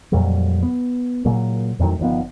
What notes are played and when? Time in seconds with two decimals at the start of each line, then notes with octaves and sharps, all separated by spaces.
0.12 F2 A#2 F#3 G3
0.63 B3
1.25 A#2 C#3 F#3 A#3
1.79 F2 A2 D#3 F#3
1.99 G1 D#3 F3 B3